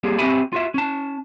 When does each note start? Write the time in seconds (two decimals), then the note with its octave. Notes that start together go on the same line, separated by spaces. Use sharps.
0.03 G3 A#3 G4 G#4
0.19 C4 F#4 G4 E5 G#5 B5
0.53 F4 F#4 E5
0.74 C#4 A5